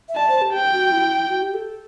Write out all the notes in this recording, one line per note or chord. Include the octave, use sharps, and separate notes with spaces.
E5
D5 A5
C5
G4
G5
F#4
E4
F#4
G4
A4